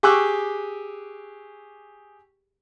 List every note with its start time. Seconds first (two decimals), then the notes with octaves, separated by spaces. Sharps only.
0.03 G4 G#4 C#6 D6 E6 F#6